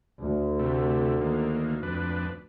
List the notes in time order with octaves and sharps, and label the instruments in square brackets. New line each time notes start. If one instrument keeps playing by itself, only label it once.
[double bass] D2
[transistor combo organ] C3 A3
D3 D#3 A#3
F2 D4 B4